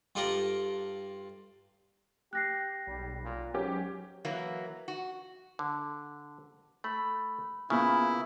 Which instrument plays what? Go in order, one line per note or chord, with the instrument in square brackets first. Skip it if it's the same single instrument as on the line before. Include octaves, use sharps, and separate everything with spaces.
[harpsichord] G2 F4 A4 D5 G5 A#5
[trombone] G4 [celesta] F#6 A#6 C7
[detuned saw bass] B1 [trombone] G3
[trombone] A#2
[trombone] G#2 [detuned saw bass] F#3 [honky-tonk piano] C#4 G4
[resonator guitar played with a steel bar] E3 F#3 A#3
F#4
[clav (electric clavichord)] D3
[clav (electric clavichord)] A3 [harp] B5
[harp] A#2 B3 B5 [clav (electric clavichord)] C#3 [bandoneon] E4